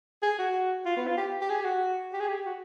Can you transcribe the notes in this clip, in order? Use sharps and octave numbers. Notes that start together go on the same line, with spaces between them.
G#4
F#4
F4
B3
F4
G4
G4
G#4
G4
F#4
G4
G#4
G4
F#4